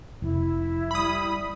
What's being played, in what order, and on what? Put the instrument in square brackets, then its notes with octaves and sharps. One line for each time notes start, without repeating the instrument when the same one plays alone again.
[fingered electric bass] F1 [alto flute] E4
[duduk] G3 [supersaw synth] B5 D#6